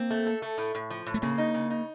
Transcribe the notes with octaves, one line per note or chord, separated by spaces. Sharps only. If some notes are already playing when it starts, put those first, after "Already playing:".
Already playing: A#3 C4
A3
A4
A3
A2
A2
F3
A2
A3
C#3 A#3
D#4
C#3
D#4